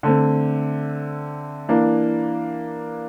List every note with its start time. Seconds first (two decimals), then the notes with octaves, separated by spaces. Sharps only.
0.03 D3 A3 C4
1.69 E3 A#3 D4